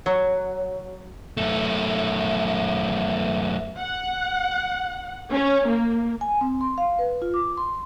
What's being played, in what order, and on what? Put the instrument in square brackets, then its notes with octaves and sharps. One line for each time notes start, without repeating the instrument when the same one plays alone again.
[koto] F#3
[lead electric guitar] F#2 A3
[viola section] F#5
C#4
A#3
[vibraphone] G#5
C4
C6
F5
B4
F4
D6
C6